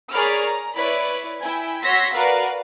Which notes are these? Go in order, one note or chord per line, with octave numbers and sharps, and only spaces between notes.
G#4 A#4 C#5 D5 B5 F6
A#5
E4 B4 C#5 D5 B5
E4 G5 G#5
F#4 C#5 C6 E6 A#6 B6
F#4 A#4 B4 D5 F5